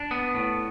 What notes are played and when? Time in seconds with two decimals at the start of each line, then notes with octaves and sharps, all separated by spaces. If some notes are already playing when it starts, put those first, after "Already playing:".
Already playing: D4
0.11 B3
0.35 A2